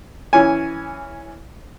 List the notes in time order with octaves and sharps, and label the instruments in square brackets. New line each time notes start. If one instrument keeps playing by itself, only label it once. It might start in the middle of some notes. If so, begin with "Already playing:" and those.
[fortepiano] E3 C#4 G#5